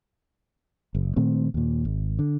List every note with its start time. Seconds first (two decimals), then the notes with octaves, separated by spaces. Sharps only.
0.95 F#1
1.16 A#2 D#3 A3 C4
1.54 D#2 A#2
1.85 G#1
2.19 D3